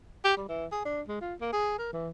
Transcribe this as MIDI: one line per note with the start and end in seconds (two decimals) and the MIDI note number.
0.25 0.34 67
0.37 0.46 55
0.49 0.66 52
0.72 0.84 68
0.85 1.02 62
1.08 1.19 56
1.21 1.34 65
1.41 1.50 58
1.53 1.74 68
1.79 1.90 70
1.93 2.09 52